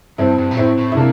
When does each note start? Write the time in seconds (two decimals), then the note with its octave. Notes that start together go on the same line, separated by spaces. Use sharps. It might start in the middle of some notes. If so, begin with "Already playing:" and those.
0.18 G2 C4 E4
0.38 G2
0.51 A#2
0.57 A2 C4 E4
0.78 A2
0.92 E4
0.96 C3 A#3 D4